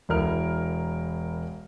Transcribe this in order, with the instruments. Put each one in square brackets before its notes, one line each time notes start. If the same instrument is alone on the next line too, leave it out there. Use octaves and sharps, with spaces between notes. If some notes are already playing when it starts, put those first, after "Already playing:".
[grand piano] E1 E4 A#4 F6